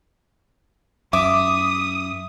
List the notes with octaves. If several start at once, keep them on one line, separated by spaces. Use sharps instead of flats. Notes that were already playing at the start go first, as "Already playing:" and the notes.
F#2 E5 D6 D#6